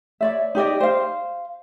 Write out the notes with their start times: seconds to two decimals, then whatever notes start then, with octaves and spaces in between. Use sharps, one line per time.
0.21 C#5 D5 E5
0.55 D#4 G4 D5 D#5
0.80 C5 F5